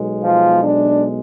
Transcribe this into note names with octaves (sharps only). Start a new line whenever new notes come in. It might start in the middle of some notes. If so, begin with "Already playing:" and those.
Already playing: B1 B2 G#3
F3 F4
D4